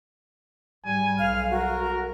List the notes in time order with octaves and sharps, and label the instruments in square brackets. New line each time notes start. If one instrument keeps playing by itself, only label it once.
[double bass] G#2 G3 [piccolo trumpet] G#5
[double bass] B1 [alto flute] F5 [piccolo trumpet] F6
[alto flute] F#4 [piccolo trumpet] A#4